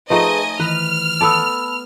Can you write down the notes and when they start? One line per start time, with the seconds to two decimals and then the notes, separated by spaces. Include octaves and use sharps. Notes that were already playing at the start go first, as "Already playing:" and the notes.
0.10 F3 A3 D#4 G#4 B4 D#5 G#5
0.60 D#3 E3 B4 F6
1.21 B3 A4 D5 A5 B5 E6